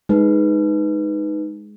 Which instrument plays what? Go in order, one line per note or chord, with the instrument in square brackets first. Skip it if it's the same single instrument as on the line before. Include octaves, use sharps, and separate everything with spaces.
[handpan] G#3 [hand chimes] D#4 B4